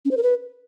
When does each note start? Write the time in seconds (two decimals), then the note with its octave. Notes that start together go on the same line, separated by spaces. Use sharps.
0.05 C#4
0.11 C5
0.17 A#4
0.23 B4